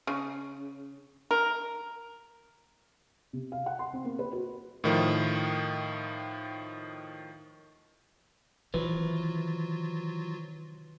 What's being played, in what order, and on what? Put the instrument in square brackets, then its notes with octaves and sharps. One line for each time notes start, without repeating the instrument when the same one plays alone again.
[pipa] C#3
A#4
[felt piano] C3
F5
F#5
C6
C4
A#3
B4
F#4
[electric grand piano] A2 D#3 F3
[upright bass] C3 D#3 [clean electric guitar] E3 [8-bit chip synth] F#3 F4 F#4 [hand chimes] B4 C5